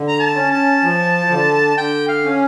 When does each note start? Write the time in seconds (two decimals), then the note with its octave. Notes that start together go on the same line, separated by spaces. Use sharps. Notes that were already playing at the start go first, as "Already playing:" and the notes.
Already playing: D3
0.08 A#5
0.20 A5
0.35 C#4
0.51 A5
0.83 F3
1.30 D3
1.77 D3 G5
2.08 F5
2.25 C#4